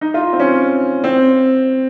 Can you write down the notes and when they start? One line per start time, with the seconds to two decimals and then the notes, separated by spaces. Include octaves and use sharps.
0.01 D#4
0.14 F4
0.33 C4
0.40 C#4
1.04 C4